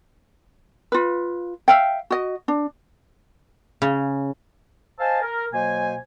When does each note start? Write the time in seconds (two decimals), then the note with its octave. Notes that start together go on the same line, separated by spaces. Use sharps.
0.92 F4 B4
1.68 E5 F5 G5
2.10 F#4 D#5
2.48 D4
3.82 C#3
4.99 C5 D#5 F5 G#5 A5
5.21 A#4
5.52 B2 F#3 A#3 C5 G#5